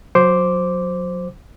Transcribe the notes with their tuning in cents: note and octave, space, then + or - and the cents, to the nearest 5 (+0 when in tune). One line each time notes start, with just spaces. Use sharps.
F#3 -20 C5 +0 D6 -5